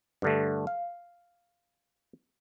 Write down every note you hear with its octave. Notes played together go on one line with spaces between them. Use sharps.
G2 D3 A3
F5